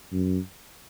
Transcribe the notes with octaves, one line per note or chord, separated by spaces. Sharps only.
F#2